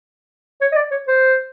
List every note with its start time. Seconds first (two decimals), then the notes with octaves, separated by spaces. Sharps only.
0.61 C#5
0.72 D#5
0.76 D5
0.91 C#5
1.07 C5